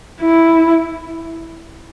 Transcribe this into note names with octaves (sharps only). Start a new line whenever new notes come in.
E4